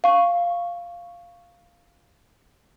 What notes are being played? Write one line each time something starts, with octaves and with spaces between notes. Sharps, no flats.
F5 C#6